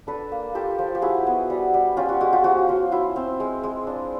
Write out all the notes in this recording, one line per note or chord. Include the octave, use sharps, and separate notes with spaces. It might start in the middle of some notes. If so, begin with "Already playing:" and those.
D4 A4 B4
A#3
F4 G4 A4
F3
G4
E4 F#4 G#4
B3
G3
G3
C#4 F4 G4
F#4
G#3 F#4
F4 G4
F3 F#4
F3 F4
E4 F4
C4
G#3
G#3
D4